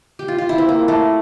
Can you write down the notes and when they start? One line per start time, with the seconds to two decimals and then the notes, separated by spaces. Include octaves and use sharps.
0.19 G4
0.28 F4
0.38 F4
0.49 E4
0.58 C4
0.69 A#3
0.88 A3